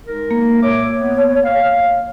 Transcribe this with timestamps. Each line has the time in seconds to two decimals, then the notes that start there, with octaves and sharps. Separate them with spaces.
0.07 G#3 D#4 A#4
0.31 A#3
0.63 A#2 C#5 E5 D6
0.99 B3
1.45 F5